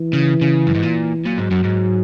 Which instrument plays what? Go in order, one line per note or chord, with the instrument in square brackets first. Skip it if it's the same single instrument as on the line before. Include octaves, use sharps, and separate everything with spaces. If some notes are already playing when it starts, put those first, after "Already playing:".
Already playing: [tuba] E3
[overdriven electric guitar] C#3
C#3
F#2
G#2
A#2
[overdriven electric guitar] A#2 [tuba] F#3
[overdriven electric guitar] G#2
F#2
G#2